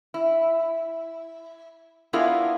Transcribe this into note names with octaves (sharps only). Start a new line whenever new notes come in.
E4
B3 D4 E4 F4 G#4 A#4